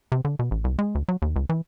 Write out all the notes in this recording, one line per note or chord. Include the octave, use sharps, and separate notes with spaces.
C3
D3
B2
A1
C2
G#3
D2
F#3
D#2
C#2
E3